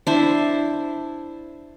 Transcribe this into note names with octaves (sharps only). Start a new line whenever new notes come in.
D4 E4 C5